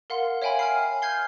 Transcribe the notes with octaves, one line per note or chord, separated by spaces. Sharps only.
A#4 F5 F#5 C6
C#5 E5 F5 G5 G#5 B5
G#5 F6 C7
F6 G6 G#6 C7 G7